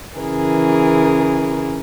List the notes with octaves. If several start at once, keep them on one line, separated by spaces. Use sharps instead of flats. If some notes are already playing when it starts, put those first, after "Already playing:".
C#3 E3 G#4 A#4